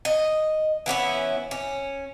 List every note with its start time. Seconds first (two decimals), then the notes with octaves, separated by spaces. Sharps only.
0.05 D#5
0.86 E3 B3 C#4 E4
1.51 C#4